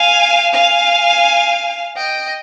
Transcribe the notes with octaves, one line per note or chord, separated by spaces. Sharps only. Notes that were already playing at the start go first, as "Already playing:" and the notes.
Already playing: F5 G#5
F5 G#5
D#5 G5